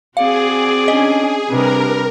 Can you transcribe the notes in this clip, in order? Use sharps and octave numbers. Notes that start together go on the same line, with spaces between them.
C4 F#4 G#4 D5 F5
C#4 D4 D#5
C3 G3 D4 A#4 B4